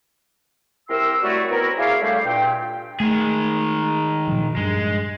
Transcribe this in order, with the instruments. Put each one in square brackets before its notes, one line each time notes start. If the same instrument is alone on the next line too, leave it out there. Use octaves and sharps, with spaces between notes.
[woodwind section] C2 G4 A#4 E5 C6 E6
F#3 G3 A3 E4 F#4
B3 C4 E4 F#4 A#4
E4 G#4 C#5 D5 E5 F5
A2 D3 G3 A3 G4 F5
G2 A#2 G5
[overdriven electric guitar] D#3 G#4 [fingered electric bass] A3
[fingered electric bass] A#2 F3 F#3
[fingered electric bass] G2 [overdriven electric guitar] G#3